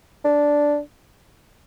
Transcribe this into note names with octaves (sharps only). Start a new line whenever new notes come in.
D4